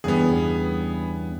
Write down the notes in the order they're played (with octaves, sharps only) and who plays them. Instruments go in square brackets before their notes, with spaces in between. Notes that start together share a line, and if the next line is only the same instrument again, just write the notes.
[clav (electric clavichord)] E2 G2 C#3 [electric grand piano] B3 G#4